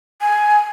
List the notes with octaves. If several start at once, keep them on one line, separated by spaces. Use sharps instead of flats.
G#5